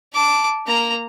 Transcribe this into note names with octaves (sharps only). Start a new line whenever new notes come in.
A5 D6
A#3 A#5